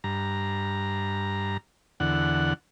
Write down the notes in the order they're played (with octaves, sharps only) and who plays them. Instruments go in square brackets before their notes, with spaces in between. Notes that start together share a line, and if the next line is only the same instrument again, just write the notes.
[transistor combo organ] G2 A#5
E2 D3 F#5